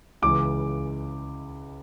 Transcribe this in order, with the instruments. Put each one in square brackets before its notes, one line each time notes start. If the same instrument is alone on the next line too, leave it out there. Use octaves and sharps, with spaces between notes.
[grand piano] C#2 C#3 E3 G#3 D6